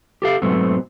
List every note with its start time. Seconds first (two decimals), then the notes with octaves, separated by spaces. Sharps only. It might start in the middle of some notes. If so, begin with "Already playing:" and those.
0.22 G4 A4 F5
0.42 G#2 B2 F#3 A3 B3 C4